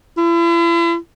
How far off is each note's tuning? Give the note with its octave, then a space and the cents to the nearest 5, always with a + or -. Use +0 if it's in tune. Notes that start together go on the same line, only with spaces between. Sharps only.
E4 +40